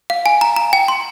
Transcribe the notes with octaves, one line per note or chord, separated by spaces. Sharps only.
F5
G#5
A#5
A#5
G5
C6